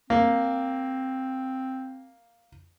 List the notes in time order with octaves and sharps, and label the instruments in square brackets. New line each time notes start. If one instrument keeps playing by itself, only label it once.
[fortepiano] A#3 [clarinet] C4